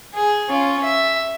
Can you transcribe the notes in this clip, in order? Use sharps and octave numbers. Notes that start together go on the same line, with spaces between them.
G#4
C#4 F4
E5